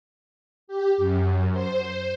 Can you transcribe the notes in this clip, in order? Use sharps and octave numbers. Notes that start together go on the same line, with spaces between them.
G4
F#2
C5